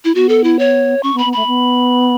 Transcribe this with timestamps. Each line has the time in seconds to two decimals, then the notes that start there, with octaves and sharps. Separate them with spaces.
0.05 E4
0.15 B3 F#4
0.29 A4
0.44 E4
0.59 C#5
1.03 C#4 C#6
1.14 B3
1.18 B5
1.25 B3
1.33 A3 B5
1.47 B3